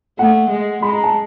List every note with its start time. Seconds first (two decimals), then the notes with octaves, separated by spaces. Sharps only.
0.19 A3 F#5
0.50 G#3
0.82 G#3 B5
0.92 A#5
1.03 A5